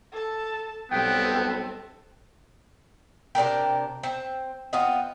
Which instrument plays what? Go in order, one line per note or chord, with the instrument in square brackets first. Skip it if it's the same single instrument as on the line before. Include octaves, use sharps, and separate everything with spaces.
[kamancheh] A4 A5
[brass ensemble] B1 G3 [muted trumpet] B3 [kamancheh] C4 A4 [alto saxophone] G5
[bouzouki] C3 D4 A#4 G5
C4
B3 C4 F4 D#5